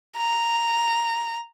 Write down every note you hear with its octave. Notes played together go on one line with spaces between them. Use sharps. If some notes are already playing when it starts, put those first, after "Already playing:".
A#5